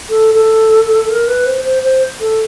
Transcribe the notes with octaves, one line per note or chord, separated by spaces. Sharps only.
A4
A4
A#4
B4
C5
C5
C5
A4